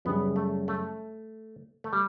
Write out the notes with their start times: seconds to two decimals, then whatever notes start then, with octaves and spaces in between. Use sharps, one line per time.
0.05 F#2 C#3 G3 B3 C#4
0.36 A3
0.68 A3
1.84 A3
1.93 G3